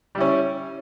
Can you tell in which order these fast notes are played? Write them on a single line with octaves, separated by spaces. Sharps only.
G3 E4 C#4